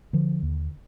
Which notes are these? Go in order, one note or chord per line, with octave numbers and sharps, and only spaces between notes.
D3 F3
D#2